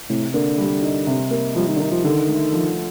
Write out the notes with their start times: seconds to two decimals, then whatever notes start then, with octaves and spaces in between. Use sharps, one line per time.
0.10 A2 C3
0.34 D3 A#3
0.58 G3
0.82 D#4
1.07 C3
1.31 A#3
1.55 F3 G3
1.68 D#3
1.76 D3
1.79 D#3 D#4
1.92 F3
2.04 D3 D#3
2.29 A3
2.52 F3